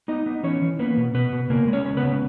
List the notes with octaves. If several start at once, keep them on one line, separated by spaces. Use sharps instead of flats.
B3 D#4 D#5
B3
E3 C#4 C#5
E3
A#3 B3 B4
B2
B2 B3 B4
B2
C#3 A#3 A#4
G#3
C#4 C#5
C#4
B3 B4
C#3